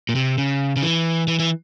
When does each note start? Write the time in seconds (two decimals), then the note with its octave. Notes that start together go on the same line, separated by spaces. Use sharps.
0.09 A#2
0.15 C3
0.38 C#3
0.76 C#3
0.83 E3
1.28 E3
1.39 E3